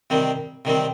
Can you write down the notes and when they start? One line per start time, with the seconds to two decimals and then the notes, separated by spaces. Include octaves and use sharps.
0.10 C3 D#3 G3 C4
0.65 C3 D#3 G3 C4